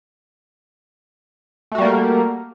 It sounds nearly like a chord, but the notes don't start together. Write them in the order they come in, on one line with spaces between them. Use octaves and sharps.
A3 F#4 G3 A#3 A#4